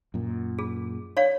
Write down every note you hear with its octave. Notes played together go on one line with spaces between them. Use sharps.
F#2 A#2
G#4
C#5 D5 F5